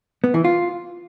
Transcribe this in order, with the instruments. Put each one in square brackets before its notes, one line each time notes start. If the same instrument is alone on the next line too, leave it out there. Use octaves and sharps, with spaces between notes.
[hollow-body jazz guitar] B3
E3
F4